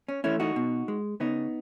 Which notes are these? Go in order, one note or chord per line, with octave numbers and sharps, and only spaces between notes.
C#4
E3 A3 C#4 E4
D#4 F#4
B2
G#3
C#3 B3 D#4